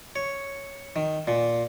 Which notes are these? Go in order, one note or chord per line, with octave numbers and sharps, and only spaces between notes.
C#5
D#3
A#2